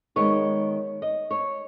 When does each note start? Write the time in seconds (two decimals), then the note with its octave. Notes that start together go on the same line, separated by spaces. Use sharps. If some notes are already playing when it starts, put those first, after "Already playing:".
0.16 D#3 G#3 B3 C#5
1.02 D#5
1.31 C#5